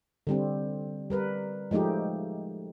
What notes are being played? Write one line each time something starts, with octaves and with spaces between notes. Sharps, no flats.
D3 G3 C4
G3 A#4 B4
F3 G#3 A3 D#4 G4